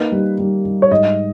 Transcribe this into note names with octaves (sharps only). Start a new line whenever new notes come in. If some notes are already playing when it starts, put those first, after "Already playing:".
Already playing: A#3 D#4 B4
G3
G3
G3
C#5
G#2 D#5